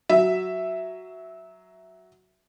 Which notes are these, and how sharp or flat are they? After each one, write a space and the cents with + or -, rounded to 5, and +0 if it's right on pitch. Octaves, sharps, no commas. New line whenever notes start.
F#3 +0 E5 +0